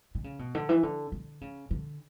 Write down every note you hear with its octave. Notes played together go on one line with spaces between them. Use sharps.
D3
C#3
B2
D3
E3
D3
D3
C#3
D3